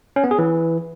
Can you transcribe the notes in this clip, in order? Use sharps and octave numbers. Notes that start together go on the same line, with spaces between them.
C#4
B3
G#4
E3